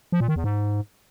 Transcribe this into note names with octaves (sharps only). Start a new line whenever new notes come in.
F3
A#2
D#3
E2
G#2